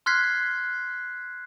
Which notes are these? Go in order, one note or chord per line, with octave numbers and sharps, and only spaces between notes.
C6 F6 F#6 G#6 B6 C7